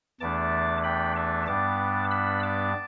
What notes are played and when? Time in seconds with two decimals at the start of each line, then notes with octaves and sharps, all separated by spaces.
0.20 E2 E3 A3 D4 A5 D6
0.84 G5 B5
1.16 E5 A5
1.47 G2 G3 B3 D4 A5 D6
2.11 B5 E6
2.43 A5 D6